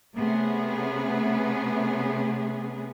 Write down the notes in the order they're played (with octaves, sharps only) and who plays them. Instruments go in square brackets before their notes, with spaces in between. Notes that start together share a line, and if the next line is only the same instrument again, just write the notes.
[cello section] C3 A3 B3 C#4 G#4